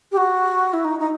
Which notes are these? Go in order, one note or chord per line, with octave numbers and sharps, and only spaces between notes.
G4
F#4
E4
D#4
D#4